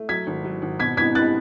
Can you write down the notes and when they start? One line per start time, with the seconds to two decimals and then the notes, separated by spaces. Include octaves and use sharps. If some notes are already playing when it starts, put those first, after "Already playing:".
Already playing: A3
0.09 F#3 G#6 B6
0.27 G#1
0.44 F#3
0.62 G#1
0.79 B2 G#6 B6
0.97 B3 G#6 B6
1.15 B3 F#6 A6